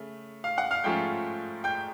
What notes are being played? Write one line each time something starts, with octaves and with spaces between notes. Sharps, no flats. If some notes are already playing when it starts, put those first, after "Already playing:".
Already playing: C#3 A3
F5 F6
F#5 F#6
F5 F6
G#2 F3 A3 C#4 F4 G5 G6
G5 G6